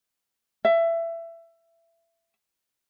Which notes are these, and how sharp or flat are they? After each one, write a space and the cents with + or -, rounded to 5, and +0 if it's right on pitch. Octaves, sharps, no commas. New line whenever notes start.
E5 +20